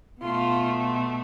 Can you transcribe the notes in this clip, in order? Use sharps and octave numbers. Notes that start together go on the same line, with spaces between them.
B2 A3 F4